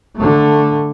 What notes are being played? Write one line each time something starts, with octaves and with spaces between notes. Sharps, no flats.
D3 A3